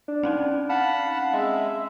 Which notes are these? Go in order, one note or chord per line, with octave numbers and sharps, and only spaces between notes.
D4
C4 C#4 D#4
F5 F#5 A5 B5
G#3 E5